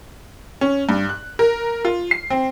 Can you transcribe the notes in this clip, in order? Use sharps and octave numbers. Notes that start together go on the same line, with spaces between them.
C#4
G2
F#6
A#4
F4
C7
C4